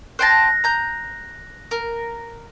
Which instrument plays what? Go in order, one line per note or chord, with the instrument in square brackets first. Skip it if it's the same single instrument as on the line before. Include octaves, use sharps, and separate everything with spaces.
[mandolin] C5 G5 A5 [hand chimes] F#6 A#6
[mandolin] A#5 G6
A#4